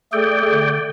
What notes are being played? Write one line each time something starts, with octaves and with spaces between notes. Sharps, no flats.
A3 G#4 A4 D5 G5
D3